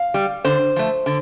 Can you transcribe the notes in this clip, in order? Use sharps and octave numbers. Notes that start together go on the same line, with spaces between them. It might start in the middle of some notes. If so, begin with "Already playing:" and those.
Already playing: F5
G3
D3 C5
F3 A3
D3